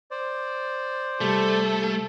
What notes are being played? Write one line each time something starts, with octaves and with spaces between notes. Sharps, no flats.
C5 D5
C2 G3 A3 A4